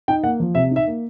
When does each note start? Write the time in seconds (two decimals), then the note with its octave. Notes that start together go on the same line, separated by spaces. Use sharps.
0.08 D#4 G5
0.23 A#3 F#5
0.40 F3
0.55 C3 E5
0.71 D#4 E5
0.87 A#3